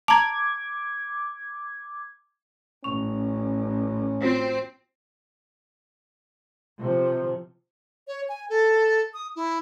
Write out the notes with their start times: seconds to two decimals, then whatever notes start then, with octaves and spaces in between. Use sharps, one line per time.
0.08 A5 A#5 D6 G#6
2.84 A1 C#4 C#6 F7
4.22 C4 F4 F#4 C5
6.79 C3 F3
8.08 C#5
8.29 G#5
8.50 A4
9.14 D#6
9.36 E4